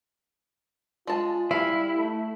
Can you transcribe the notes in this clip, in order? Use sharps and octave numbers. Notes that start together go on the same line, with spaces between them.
G#3 F4 A5
G3 E4 F5
A3